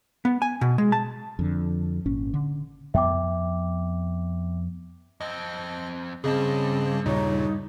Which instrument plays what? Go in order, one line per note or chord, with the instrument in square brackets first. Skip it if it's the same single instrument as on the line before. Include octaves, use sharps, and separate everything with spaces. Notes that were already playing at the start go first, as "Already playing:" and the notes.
[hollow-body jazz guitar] B3
G#5
B2
G#3
A5
[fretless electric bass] F2 D3
G#1 A#2 C#4
D3
[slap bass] F2 B3 [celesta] E5 G5 D6
[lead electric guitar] F2 C4 [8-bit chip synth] D#5
[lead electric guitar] E2 G2 [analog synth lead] C#3 [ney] C4 [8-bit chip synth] G#4 D#5 A5
[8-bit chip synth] D#2 A#2 C#3 [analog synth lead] D#4 [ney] C#5